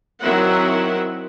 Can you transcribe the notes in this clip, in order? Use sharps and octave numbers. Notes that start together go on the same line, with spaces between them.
D#3 F#3 C4 E4 E5 F#5